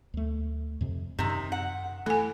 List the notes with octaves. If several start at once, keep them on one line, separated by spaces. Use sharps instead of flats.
D2 A3
F2 C3
F#2 C3 D#3
F#5
E3 A3 A4 G#5